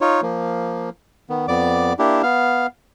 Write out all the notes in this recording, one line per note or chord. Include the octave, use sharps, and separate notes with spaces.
D#4 F4 C#5
F3 A#3
D#3 B3
F2 B3 D5 D6
A#3 D4 E4 G4
B3 F5